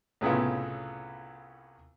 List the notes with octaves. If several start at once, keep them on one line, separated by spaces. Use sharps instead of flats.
C2 A2 C#3 B3 F4 E5